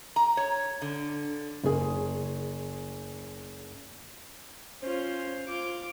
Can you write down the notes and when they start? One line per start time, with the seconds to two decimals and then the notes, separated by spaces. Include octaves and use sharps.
0.16 A#5
0.37 C#5
0.82 D3
1.63 F#1 G#4
4.82 C#4 F4 C5
5.46 F4 D6